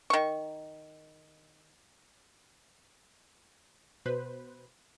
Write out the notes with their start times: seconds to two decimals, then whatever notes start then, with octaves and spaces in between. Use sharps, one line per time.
0.10 D#3 C#6
4.06 B2 B4 C5